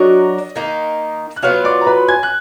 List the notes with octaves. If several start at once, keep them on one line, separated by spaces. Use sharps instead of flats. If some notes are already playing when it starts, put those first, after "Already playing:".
Already playing: F#3 D4 F#4 A#4 D#5
D#3 A#3 D#4
F#6
F#3 B3 F4 F5 F6
D5 D6
A#5
B4 B5
G#5 G#6
F#6